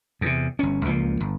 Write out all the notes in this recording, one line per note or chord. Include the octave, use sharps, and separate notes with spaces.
E2 C3
G1 C#4
C#2 F3 G#3 A#3
G1